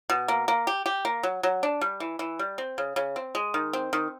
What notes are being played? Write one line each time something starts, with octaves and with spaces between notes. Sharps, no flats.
B2
A#3
A#3
G4
G4
A#3
F#3
F#3
D4
G3
E3
E3
G3
C4
C#3
C#3
C4
G#3
D#3
C4
D#3